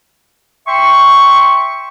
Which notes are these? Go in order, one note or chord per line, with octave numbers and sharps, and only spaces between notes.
E5 G5 C6 C#6